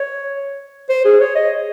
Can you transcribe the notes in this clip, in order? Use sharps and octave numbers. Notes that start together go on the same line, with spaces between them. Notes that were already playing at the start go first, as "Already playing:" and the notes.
Already playing: C#5
C5
G#4
C#5
D#5